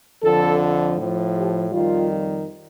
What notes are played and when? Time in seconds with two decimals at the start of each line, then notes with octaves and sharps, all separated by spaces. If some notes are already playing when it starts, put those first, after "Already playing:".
0.22 F2 D3 F3 A4
0.97 A2
1.02 F3
1.35 G4
1.72 F2 D#3 G3 F4